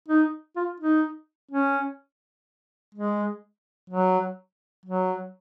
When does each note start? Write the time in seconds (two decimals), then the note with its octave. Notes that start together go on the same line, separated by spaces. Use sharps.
0.08 D#4
0.56 F4
0.80 D#4
1.51 C#4
2.95 G#3
3.90 F#3
4.85 F#3